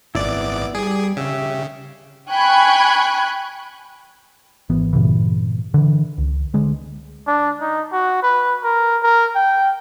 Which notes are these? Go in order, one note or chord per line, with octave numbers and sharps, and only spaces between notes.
G#1 B3 E4 D5
G3 G#4 D5
C#3 G4 E5
G5 G#5 B5 C#6 F#6 G#6
G#1 E3 B3
G2 A#2 C#3 E3
D3 E3
C#2
D3 G#3
D4
D#4
F#4
B4
A#4
A#4
G5